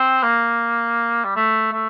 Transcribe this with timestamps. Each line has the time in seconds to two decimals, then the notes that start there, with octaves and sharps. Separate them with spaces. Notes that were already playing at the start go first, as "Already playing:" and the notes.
Already playing: C4
0.23 A#3
1.24 G3
1.36 A3
1.72 A3